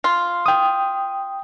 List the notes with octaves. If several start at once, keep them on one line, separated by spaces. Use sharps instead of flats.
F4
G5 D#6